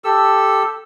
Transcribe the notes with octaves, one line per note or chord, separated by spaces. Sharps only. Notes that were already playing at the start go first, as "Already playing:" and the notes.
G4 A4 E6